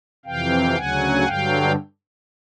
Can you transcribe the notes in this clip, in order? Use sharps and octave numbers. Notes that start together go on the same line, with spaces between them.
F2 C3 E3 F5 G5
D2 C#3 F#3 F#5 G#5
G2 D3 F#3 F5 G5